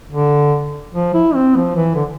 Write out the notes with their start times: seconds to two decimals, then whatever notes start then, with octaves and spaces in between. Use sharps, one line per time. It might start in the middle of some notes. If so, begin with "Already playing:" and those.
0.12 D3
0.94 F3
1.14 E4
1.34 C4
1.56 F3
1.76 E3
1.95 D3